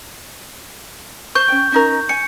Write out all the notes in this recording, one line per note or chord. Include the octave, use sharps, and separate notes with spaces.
C5 C#6 G6
C#4 G5
C#4 D#4 A#4
G#5 C#7